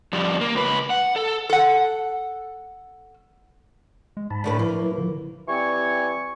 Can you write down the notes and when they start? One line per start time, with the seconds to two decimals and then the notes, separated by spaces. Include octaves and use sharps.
0.13 F2 G3
0.41 A#3
0.55 C#2 B4
0.90 F#5
1.16 A4
1.50 A4 F#5
4.17 G#3
4.31 G#2 A5 B5
4.44 D2 A2 B4
4.59 F3 A#3 E4 B4
4.82 F#3
4.98 D3 F3
5.48 E3 G3 C4 G4 G#5 C#6